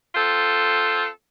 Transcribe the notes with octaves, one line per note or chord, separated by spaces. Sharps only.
C4 F4 A4